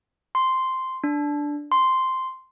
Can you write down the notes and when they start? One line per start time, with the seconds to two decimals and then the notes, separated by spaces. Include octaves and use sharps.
0.35 C6
1.04 D4
1.72 C6